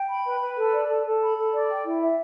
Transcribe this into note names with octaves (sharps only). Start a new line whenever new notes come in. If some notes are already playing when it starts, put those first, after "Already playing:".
Already playing: G5
B5
B4
B4
A4
D5
A4
A4
B5
A4
D5
G5
E4
E5